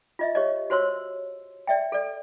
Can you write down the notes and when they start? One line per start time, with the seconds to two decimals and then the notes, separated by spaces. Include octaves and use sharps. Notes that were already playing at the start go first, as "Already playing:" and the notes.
0.19 F4 D#5 E5
0.35 G4 C#5 D#5
0.70 F#4 C5 C#5 C6 E6
1.67 D5 E5 G5
1.92 A4 D5